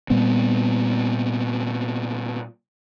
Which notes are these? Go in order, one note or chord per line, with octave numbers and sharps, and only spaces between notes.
A#2 G3 B3 C4